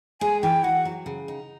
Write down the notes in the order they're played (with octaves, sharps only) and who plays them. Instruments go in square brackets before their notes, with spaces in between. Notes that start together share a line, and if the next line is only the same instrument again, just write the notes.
[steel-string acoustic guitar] G#3 [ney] G#5
[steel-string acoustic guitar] E3 [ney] G5
[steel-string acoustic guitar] F#4 [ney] F#5
[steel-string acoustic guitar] F#3
C#3
D#4